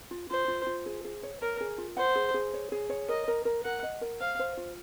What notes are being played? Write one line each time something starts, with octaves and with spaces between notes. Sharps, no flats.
F4
F4 C5
F4
F4
G#4
G#4
C#5
A#4 C#5
G#4
F4
C5 F#5
G#4
G#4
C#5
G#4
C#5
A#4 D#5
A#4
A#4
A#4 F#5
D#5
A#4
C5 F5
C5
F4